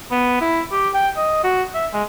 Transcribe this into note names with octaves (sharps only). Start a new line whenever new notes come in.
B3
E4
G4
G5
D#5
F#4
E5
G#3